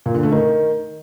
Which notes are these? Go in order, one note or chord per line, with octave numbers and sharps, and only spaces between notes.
A#2
D3
A3
D#3